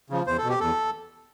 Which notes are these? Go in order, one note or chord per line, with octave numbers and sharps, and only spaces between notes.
C#3 F3
E2 C5
A4
B2
G4
E2 A4